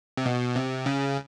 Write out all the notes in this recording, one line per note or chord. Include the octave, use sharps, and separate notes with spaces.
C3
B2
C3
C#3